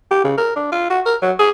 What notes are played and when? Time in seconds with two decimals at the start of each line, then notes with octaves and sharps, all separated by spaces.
0.11 G4
0.24 C#3
0.38 A#4
0.56 D4
0.72 F4
0.90 F#4
1.06 A#4
1.22 F#3
1.39 G#4